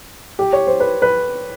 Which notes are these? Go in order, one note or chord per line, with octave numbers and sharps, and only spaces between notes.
G4
C#5
C5
B4
B4